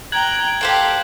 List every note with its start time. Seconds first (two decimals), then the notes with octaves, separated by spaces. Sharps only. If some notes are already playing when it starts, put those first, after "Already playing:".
0.12 G5 A#5 F#6 G#6 F#7
0.61 G4 A4 C5 F5 G5